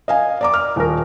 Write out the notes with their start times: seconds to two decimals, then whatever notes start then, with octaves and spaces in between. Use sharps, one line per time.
0.08 D#5 F5 G#5
0.41 D5 A#5 D6
0.54 F6
0.76 D#1 A#4